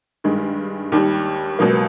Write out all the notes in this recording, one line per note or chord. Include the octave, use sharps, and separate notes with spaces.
G2 D#3 G#3
D#2 D#3 G3
C#2 B2 F#3 A#3